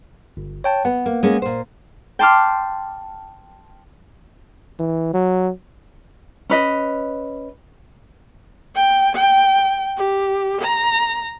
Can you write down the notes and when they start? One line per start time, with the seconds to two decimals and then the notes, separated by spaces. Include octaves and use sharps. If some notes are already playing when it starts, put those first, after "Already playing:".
0.37 G1
0.64 C#5 G5 A5
0.85 B3 F#5
1.06 A#3
1.23 G#3 A#3 C#4
1.42 A#2 C5
2.19 G5 A5 C6 D6 F6
4.79 E3
5.13 F#3
6.50 C#4 B4 D#5
8.76 G5
9.16 G5
9.98 G4
10.62 A#5